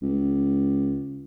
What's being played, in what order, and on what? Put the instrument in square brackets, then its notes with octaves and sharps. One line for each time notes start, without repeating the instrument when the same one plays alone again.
[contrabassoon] C#2